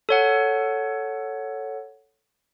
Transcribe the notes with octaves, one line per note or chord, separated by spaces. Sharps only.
A4 C#5 F#5